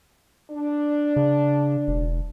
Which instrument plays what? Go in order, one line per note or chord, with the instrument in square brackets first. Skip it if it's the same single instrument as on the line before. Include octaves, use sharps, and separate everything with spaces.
[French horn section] D4
[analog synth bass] C#3
E1